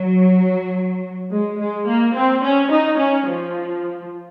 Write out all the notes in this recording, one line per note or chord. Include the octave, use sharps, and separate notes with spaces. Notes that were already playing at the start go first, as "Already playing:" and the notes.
Already playing: F#3
G#3
G#3
A#3
C4
C#4
D#4
C#4
F3